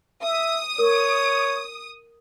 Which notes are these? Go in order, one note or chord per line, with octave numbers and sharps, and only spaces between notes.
E5 D#6
A#4 C#5